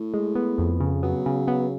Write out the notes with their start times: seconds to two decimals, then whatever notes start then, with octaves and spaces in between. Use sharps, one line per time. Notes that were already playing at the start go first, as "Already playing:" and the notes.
Already playing: A2
0.14 G#3
0.35 B3
0.58 F2
0.80 C#3
1.03 F#3 B3
1.26 C#3
1.48 B3